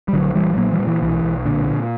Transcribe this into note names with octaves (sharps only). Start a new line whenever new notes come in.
G3
A#1 D3 F#3
A#1 E3 G3
G3
A#2 F#3 A#3
E3 G3
A#2
E3
B1 E3
B1
A#2 D3
A#2